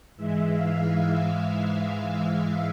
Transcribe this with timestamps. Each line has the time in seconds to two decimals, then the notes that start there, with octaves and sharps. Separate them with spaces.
0.17 G#2 E3 G#3 E5
0.51 F5
0.84 F5
1.17 E5
1.86 E5